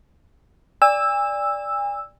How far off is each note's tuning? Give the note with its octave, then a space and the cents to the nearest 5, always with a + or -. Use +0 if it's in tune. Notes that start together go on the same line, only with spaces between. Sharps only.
D5 +0 G#5 -40 E6 +0